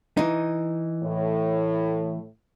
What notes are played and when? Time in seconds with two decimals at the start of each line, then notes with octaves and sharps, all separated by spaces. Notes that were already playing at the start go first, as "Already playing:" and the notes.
0.17 E3 D#4
1.03 A2